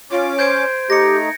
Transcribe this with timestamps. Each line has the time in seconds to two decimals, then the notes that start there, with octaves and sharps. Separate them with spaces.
0.11 C#4 F4 D6
0.39 C5 G6 G#6 D7
0.90 A3 D#4 G4 A#6 C#7